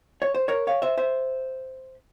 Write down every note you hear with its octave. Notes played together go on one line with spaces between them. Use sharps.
C#5
C5
A#4 C#5
C#5 F5
C5 E5
C5 E5